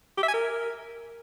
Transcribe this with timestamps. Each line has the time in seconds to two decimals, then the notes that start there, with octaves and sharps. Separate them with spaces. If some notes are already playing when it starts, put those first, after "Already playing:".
0.17 G4
0.23 E5
0.28 G#5
0.34 A#4